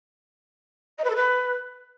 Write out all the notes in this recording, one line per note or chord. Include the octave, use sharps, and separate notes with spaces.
D#5
B4
A4
B4